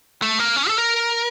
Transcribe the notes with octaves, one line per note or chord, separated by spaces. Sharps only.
A3
A#3
C#4
A4
A#4